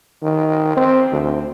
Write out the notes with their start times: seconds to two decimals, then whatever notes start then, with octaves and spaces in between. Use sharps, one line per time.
0.22 D#3
0.77 C4
1.12 D2